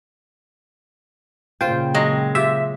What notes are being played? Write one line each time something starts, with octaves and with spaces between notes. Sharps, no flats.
A#2 C#3 F4 C5 G5
F#3 G#3
F4 G4 E5